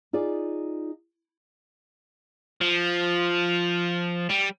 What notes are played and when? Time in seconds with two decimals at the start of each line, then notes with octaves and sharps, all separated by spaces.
0.13 D#4 F4 G#4 D5
2.61 F3
4.29 G3